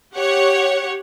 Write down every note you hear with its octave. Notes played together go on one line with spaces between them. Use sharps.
G4 C#5 F#5